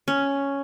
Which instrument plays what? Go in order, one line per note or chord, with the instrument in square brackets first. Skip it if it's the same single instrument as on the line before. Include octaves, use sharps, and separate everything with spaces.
[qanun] C#4